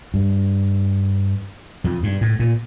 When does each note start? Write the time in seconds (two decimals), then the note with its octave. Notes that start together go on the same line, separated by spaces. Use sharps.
0.14 G2
1.84 F2
2.03 G2
2.21 A2
2.39 A#2